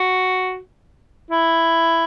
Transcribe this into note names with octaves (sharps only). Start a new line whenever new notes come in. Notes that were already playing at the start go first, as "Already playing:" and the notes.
Already playing: F#4
E4